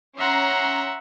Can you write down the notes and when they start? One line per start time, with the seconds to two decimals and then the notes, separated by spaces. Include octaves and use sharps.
0.17 C#4 E5 F#5 A#5 C6